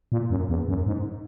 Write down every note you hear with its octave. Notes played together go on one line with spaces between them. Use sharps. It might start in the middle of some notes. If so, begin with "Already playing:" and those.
A#2
F#2
E2
F#2
G#2